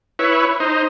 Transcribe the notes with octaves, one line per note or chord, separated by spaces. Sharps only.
E4 B4 C#5
D#4 C5